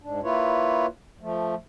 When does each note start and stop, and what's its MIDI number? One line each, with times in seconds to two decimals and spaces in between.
0.02 0.20 44
0.02 0.20 62
0.23 0.86 58
0.23 0.86 64
0.23 0.86 65
0.23 0.86 71
0.23 0.86 73
1.21 1.55 53
1.21 1.55 57